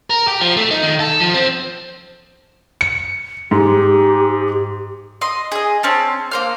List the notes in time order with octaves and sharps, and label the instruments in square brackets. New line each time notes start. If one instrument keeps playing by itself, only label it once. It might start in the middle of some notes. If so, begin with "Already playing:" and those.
[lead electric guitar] A#4
G4
F3
A3
D#4
D#3
A4
F3
C4
[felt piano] C#7
[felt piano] G#2 [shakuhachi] G4
[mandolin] D#5 C6
G#4 D#5
C4 C#4 A5
A#3 C5 F6